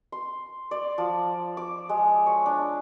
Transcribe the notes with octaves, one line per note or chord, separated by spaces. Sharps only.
C6
D5
F3
D6
G#3
C#5
D4